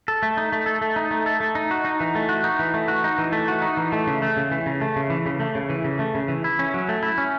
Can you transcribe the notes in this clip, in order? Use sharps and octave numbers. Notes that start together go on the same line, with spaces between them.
A4
A3
D#4
A3
A4
A3
D#4
A3
A4
A3
D#4
F#4
D#4
E3
A3
F#4
D#4
E3
A3
F#4
D#4
E3
A3
F#4
D#4
E3
A3
C#3
A3
C#3
E3
C#3
A3
C#3
E3
C#3
A3
C#3
E3
C#3
A3
C#3
E3
E4
C#4
F#3
A3
E4
C#4